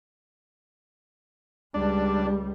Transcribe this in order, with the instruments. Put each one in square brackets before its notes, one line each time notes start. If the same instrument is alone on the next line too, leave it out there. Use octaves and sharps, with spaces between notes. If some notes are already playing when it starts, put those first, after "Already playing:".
[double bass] C#2 G3 [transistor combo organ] D4